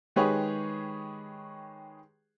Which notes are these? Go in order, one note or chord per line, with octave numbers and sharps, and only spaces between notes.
D#3 G#3 G4 G#4 B4 C#5